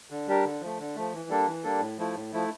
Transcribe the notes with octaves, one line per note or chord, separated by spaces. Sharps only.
D3
G3 D4 G4 A#4
D3
F3 A3
D3
F3 A3
E3
G3 A#3 D4 A4
E3
G3 A#3 D4 A4
A2
F3 A3 E4
A2
F3 A3 E4